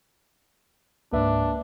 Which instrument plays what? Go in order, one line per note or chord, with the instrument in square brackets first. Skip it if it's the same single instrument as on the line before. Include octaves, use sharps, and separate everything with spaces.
[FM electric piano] C#2 G#2 [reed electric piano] A#3 B4 E5 [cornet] D4